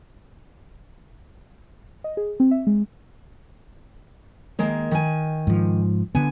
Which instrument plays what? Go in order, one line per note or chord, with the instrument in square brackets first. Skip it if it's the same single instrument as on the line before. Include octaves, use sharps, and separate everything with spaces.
[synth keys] D#5
G#4
C4
E5
G#3
[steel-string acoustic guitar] D#3 G#3 A#3
D#3 G#5
[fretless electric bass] G#2 F3
[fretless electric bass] D3 B3 [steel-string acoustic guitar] G#5